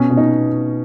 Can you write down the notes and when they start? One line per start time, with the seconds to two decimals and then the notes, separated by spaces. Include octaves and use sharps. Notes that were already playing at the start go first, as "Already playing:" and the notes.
Already playing: B2 C#4
0.10 B2
0.17 D#4